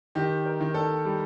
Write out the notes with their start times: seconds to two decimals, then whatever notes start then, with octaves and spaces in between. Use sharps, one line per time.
0.15 D#3 G4
0.46 A#4
0.61 D#3
0.74 A4
1.05 G3